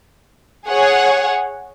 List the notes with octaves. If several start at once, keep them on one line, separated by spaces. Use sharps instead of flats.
G#4 C#5 F#5